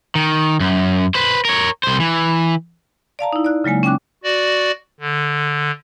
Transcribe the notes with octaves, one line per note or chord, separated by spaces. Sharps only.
D#3
F#2
B4 C5
A#4 C#5
C2 C5
E3
D5 F5 A5 A#5
D#4 E4
D5 F#6
C#3 F#3 G#3 A#3 G#5
C#4 G5 D6 F#6
F#4 D5
D3